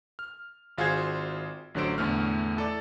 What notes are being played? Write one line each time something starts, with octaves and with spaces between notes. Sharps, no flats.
F6
G#1 F4 F#4 G#4 C5 G#6
A1 D3 F#3 C5 D7
E2 A2 D3 A3 F6
E4 A4 D5